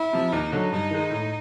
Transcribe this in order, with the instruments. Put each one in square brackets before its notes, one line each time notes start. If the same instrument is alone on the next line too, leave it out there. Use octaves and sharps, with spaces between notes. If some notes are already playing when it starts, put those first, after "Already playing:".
Already playing: [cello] E4
[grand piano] C3 F3
[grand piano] D#2 [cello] D#4
[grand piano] D3 F#3
[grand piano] G2 [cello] D#4
[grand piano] D#3 G#3
A2